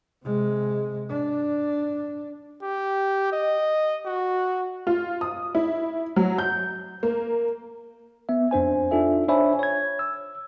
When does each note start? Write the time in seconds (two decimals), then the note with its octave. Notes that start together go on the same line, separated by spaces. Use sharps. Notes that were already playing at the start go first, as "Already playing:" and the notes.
0.24 C3 G#3
1.09 D4
2.63 G4
3.32 D#5
4.05 F#4
4.87 F4
5.21 D#6
5.55 E4
6.16 F#3
6.38 G6
7.03 A#3
8.29 B3 E5
8.51 F2 D4 C5 G#5
8.91 D4 D#4 F4 A4 E5
9.28 D4 C5 C#5 E5 G#5 B5
9.59 C#5 G#6
9.99 E6